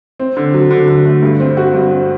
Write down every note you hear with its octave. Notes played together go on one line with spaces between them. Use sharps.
C4
D3
F#3
D3
D3
A3
G2
C4
F#4
G2
C4